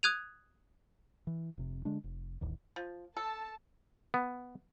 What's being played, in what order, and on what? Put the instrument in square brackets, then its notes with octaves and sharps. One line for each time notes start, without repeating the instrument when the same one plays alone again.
[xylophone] D#6 F#6 G#6 D#7 F7
[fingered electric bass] E3
F1 C3
D3 G#3 D4
F1
D1 A1 D#2
[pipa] F3
[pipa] A4 [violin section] A5
[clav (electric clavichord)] B3